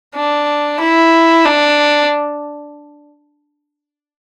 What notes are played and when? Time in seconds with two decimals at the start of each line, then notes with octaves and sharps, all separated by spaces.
0.15 D4
0.80 E4
1.45 D4